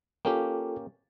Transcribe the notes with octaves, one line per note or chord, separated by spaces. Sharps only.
A#3 C#4 F4 G4 A4 G5